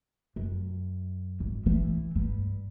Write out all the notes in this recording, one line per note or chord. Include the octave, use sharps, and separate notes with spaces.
F#2
G#1
E3
G2